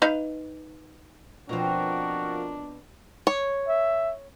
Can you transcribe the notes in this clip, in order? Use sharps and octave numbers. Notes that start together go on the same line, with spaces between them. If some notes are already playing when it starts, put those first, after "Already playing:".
D#4 B4 F5
B2 F3 C4 D4 F4 F#4 A#4
C#5
E5